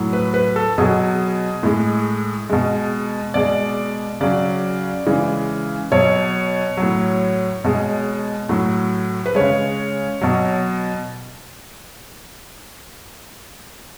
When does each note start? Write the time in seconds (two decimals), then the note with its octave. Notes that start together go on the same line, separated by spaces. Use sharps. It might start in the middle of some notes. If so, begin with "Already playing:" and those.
Already playing: A2 F#3
0.13 B4
0.34 B4
0.56 A4
0.78 B2 F#3 G#4
1.63 A2 G#3
2.50 B2 G#3
3.34 B2 G#3 D5
4.21 C#3 F#3 D5
5.06 C#3 E3 G#3
5.92 B2 F#3 C#5
6.77 A2 F#3
7.64 B2 G#3
8.49 A2 F#3
9.26 B4
9.35 C#3 G#3 C#5
10.21 B2 F#3